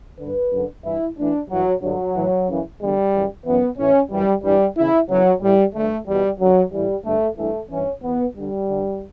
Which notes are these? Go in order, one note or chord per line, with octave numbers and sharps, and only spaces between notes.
G2 D3 B4
F#2 D3
G2 E3 E4
A2 E3 D4
G2 E3 F#3
G2 D3 F#3
A2 E3
F#2 C#3 E3
E2 D3 G3
F#2 C#3 E3
F#2 E3 B3
A2 E3 C#4
F#2 E3 G3
G2 E3 G3
E2 C#3 E3 E4
E2 C#3 E3 F#3
A2 E3 G3
G2 D3 A3
E2 B2 G3
F#2 D3 F#3
A2 E3 G3
G2 D3 A3
G2 E3 A3
G2 E3 C#4
E2 B2 B3
G2 D3 G3
G2 D3